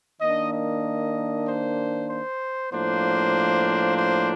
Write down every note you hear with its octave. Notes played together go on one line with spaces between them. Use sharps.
D#3 A#3 D4 D#5
D#5
C5
C5
A2 F3 A#3 D4 C5
C5